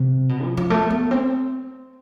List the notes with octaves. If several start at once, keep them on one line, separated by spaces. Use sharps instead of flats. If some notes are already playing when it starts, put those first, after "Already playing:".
Already playing: C3
B2
F3
F3
A3
B3
C4